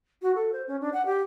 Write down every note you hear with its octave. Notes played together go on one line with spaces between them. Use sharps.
F#4
A4
C5
C#4
D4
F#5
G4